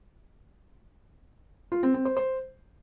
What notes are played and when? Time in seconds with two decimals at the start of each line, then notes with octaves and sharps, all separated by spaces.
1.72 F4
1.83 C4
1.94 C4
2.05 C5
2.17 C5